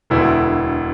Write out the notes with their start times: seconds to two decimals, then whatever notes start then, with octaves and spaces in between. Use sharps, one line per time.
0.10 E1 D2 D3 B3 E4